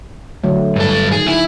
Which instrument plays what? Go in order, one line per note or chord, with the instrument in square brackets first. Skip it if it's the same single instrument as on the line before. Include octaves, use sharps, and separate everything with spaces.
[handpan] D3 F#3 A3
[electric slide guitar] G2 A4
[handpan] D#3 [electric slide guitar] G#4
[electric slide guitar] E4